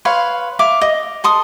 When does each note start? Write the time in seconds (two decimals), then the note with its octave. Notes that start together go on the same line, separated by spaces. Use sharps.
0.05 B4 C#5 F5 C6
0.59 E5 F5 D6
0.81 D#5
1.24 A4 C6 D#6